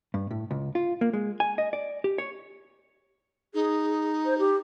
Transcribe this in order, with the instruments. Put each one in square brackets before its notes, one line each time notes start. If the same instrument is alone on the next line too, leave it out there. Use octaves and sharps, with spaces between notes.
[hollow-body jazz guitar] G2
A2
C#2
F4
A#3
G#3
G#5
D#5
D5
G4
C#5
[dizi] D#4 [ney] G#4
[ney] C5
G4